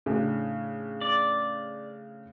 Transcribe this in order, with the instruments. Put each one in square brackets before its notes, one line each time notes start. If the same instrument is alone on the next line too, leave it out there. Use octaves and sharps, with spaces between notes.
[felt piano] A2 C#3 D4
[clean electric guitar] D5